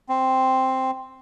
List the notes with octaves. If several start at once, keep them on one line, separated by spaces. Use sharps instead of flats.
C4